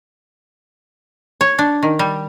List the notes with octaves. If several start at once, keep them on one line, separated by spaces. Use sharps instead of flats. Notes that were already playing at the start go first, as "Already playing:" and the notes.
C#5
D4
D#3
G3